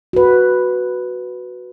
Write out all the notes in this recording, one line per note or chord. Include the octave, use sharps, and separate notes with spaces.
F#4 B4